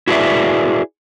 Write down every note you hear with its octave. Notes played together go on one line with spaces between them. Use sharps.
E4 F#4 G#4 B4 D5 E5